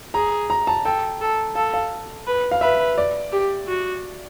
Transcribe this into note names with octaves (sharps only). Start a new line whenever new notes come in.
G#4 A#5
A#5
A5
A4 G5
A4
A4 F5
F5
B4
F5
B4 E5
D5
G4
F#4